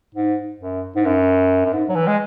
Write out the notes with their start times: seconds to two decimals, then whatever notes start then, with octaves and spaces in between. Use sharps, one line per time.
0.15 G#2
0.60 F#2
0.96 G#2
1.05 F#2
1.65 F#2
1.73 G#2
1.89 F#3
1.96 E3
2.07 G#3